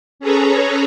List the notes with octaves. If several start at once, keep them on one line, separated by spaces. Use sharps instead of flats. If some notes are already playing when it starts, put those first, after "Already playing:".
C#4 G#4 A4 B4 C#5 A#5